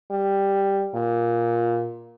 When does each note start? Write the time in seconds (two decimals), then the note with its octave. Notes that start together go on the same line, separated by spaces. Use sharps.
0.11 G3
0.95 A#2